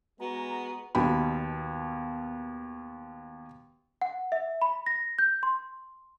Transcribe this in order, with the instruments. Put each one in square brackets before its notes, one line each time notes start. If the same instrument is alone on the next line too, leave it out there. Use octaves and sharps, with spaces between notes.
[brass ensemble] G#3 A#5 [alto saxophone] B3 [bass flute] F#4
[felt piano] D#2 B2 B5
[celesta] F#5
E5
B5
A#6
G6
C6